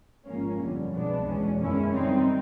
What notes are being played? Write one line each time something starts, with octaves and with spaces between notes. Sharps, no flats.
G#1 G#2 F3 A#3 C#4
G1 F2 D3 G3
C2 B2 G#3 B3 D4
E2 B2 G#3 C#4
F#2 D#3 G#3 C#4 E4
F#2 D#3 G3 C4 D#4